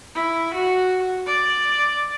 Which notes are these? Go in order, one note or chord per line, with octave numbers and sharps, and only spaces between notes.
E4
F#4
D5